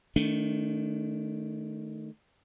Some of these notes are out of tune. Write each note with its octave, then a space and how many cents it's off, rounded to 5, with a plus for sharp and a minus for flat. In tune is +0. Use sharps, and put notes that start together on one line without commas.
D#3 +0 A3 +0 D4 -40